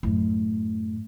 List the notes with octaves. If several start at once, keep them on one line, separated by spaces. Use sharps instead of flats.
F#2 A2